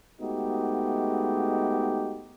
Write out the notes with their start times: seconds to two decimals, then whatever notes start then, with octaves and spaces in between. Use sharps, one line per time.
0.20 G#3 A3 B3 D#4 F#4 G4